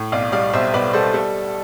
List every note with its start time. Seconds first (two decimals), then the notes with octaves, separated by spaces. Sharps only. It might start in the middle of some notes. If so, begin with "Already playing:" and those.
Already playing: A2
0.12 B1 D5 F5
0.32 G3 D5 F5
0.53 B1 C5 E5
0.74 B1 B4 D5
0.93 G3 A4 C5
1.14 G3 A4